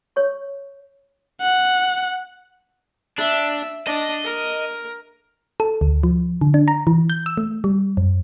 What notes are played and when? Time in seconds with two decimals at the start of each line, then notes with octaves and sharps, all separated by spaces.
0.16 C#5 C#6
1.41 F#5
3.18 D4 E5
3.87 D4 D#5
4.24 A#4
5.60 A4
5.81 D2
6.03 F3
6.41 D3
6.54 D4
6.68 A#5
6.87 E3
7.10 G6
7.26 E6
7.37 A3
7.64 G3
7.97 F#2